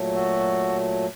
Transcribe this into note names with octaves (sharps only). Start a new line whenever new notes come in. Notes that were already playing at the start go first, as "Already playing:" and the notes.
Already playing: A#2 F#3 A3
F#4 A4